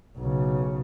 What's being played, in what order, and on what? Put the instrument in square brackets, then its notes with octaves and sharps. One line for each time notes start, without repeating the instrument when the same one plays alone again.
[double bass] B1 C#3